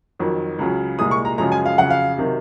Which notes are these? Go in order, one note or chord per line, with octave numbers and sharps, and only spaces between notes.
F2 D#3 F#3
C#2 C#3 F#3
C2 A#2 G#3 D#6
C#6
A#5
F#2 C#3 F3 G#3 A#5
G#5
F5
F2 C#3 F#3 F#5
F5
C3 D#3 F#3